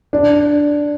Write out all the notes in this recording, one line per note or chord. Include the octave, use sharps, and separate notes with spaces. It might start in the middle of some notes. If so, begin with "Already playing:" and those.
D4